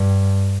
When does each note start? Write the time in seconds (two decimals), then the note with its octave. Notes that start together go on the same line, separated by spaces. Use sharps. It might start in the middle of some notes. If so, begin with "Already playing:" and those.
Already playing: G2